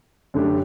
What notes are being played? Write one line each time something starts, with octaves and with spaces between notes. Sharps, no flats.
F#2 D3 A3 D4 G4